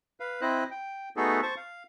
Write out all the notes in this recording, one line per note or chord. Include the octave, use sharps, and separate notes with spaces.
B4 F5
C4 E4 C5 D#5 F#6
G5
A3 B3 D#4 F#4 G#4 A4
C5 A5 C#6
F5